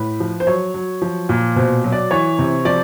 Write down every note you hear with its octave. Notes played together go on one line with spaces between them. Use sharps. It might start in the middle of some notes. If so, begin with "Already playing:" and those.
Already playing: A2 B4
F3
C5
F#3 C#5
F#3
F3
A#2
B2 C5
F#3
D5
E3 C#5
C3
F3 D5